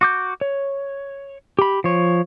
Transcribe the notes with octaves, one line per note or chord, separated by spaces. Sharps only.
F#4 D6 G6
C#5
G4 B5
F3 C#5